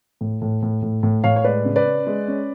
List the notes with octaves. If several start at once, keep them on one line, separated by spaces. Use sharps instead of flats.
A2
A2
A2
A2
A2
A2 C#5 F5
C#5
G#3 B4 D5
C#3
B4 D5
C#4
G#3
C#4